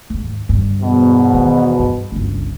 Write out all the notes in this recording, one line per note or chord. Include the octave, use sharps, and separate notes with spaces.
D#2 G#2
G2 D3
E2 G#2 B2
D#3
G2
G1 C#2